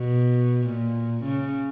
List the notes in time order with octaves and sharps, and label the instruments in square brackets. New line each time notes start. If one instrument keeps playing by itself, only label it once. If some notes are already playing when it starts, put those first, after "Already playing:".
Already playing: [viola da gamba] B2
A#2
C#3